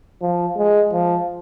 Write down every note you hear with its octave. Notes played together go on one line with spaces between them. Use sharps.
F3
G#3
F3